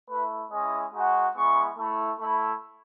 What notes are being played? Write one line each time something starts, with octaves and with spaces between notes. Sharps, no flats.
A3 E4 B4
G#3 C#4 E4 D#5
G#3 D#4 F#4
G#3 B3 E4 C#6
A3 E4
A3 E4 B5